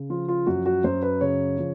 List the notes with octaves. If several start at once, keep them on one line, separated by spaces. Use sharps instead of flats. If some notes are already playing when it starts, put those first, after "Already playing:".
Already playing: C#3
F3 F4
F4
F#2 F#4
F#4
F#2 C5
B4
C#3 C#5
F3